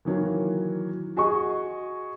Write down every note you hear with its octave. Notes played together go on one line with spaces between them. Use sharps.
D#3 E3 F#3 A#3
F#4 G#4 D#5 C#6